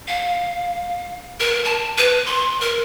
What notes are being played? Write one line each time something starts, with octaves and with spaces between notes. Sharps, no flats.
F5
A#4
A5
B4
C6
A#4